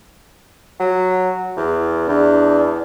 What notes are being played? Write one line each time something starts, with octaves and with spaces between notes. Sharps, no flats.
F#3
E2
E2 D4